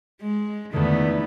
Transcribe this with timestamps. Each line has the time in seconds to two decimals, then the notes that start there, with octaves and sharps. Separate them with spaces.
0.21 G#3
0.73 E2 D3 D#3 A3 B3